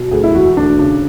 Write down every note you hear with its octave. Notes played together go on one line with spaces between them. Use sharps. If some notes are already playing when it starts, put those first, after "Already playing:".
Already playing: B2
D2 G#4
E4
E1 F#4
D2 D4
C#3 D4